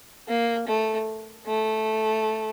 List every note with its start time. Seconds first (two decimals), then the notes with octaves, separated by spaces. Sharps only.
0.28 A#3
0.68 A3
1.47 A3